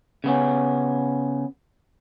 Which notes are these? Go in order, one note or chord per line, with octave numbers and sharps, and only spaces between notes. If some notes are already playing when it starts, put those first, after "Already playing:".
C#3 B3 C#4